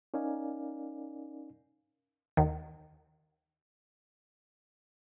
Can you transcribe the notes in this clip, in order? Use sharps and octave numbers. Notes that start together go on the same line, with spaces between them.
C#4 D#4 A#4 D5 F5 G#5
D#2 D#3